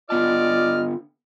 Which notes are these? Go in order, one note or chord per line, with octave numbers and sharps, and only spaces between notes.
D3 B3 F4 D5 D#5 A5 F6